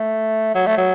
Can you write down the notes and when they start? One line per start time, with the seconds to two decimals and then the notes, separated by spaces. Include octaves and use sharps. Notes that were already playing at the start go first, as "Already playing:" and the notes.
Already playing: A3
0.55 F#3
0.66 A3
0.78 F#3